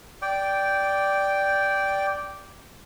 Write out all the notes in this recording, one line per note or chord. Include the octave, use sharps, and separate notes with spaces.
D5 G5